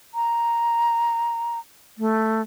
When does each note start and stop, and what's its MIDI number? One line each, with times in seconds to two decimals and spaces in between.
0.14 1.59 82
1.98 2.42 57